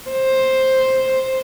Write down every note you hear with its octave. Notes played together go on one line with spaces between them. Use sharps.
C5